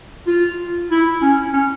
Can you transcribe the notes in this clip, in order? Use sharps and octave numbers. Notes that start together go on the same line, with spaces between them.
F4
E4
C#4
C#4